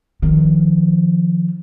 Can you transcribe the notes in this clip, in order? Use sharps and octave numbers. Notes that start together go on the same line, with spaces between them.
D#3 F3